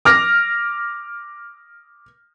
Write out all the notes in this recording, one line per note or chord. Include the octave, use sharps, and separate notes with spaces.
D6 F6 A#6